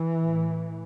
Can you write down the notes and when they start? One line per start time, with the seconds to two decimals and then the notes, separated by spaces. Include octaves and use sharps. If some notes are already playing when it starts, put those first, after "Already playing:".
Already playing: E3
0.21 A2